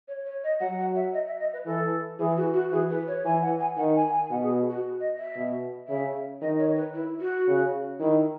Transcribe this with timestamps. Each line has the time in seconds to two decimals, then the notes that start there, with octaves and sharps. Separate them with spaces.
0.08 C#5
0.25 C#5
0.44 D#5
0.60 F#3 F#5
0.78 F#5
0.96 E5
1.13 D#5
1.27 E5
1.40 D#5
1.53 B4
1.66 E3 A4
2.19 E3 G#4
2.37 F#4
2.54 F#4
2.71 E3 G#4
2.90 B4
3.08 C#5
3.24 E3 G#5
3.42 F#5
3.60 G#5
3.77 D#3 F#5
3.96 G#5
4.12 G#5
4.30 B2 F#5
4.43 G#4
4.70 F#4
5.00 D#5
5.18 E5
5.35 B2
5.88 C#3 E5
6.42 D#3 D#5
6.59 C#5
6.76 B4
6.94 E4
7.20 F#4
7.47 C#3
8.00 D#3 E4